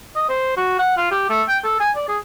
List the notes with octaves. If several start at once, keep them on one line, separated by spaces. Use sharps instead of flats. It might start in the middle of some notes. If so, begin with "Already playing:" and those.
D#5
C5
F#4
F#5
F4
G4
A3
G5
A4
G#5
D5
G#4